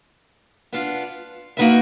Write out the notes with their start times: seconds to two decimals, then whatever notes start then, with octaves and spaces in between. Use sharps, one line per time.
0.73 B3 D4 F4
1.57 A#3 D#4 F#4 B4 E5